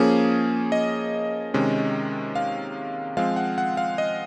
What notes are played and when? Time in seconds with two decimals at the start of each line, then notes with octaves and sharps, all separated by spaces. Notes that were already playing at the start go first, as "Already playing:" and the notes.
Already playing: F3 A#3 C#4 G#4
0.72 D#5
1.54 C3 D#3 G#3 C#4
2.35 F5
3.17 F3 G#3 C4 F5
3.36 F#5
3.58 F#5
3.77 F5
3.98 D#5